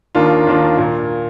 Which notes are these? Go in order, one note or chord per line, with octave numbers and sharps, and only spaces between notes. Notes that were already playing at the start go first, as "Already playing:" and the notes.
D#2 D#3 A#3 D4 F4
D#2 D#3 A#3 D4 F4
A#2